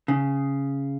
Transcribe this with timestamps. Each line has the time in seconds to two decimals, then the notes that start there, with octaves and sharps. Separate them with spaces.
0.08 C#3